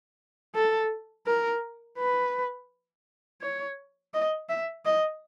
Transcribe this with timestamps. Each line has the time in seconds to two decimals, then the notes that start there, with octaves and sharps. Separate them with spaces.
0.55 A4
1.27 A#4
1.98 B4
3.41 C#5
4.14 D#5
4.49 E5
4.85 D#5